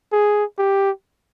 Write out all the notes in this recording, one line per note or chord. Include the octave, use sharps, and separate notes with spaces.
G#4
G4